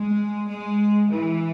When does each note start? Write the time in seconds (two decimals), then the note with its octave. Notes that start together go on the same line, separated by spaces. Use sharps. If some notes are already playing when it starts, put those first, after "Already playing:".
Already playing: G#3
0.49 G#3
1.09 E3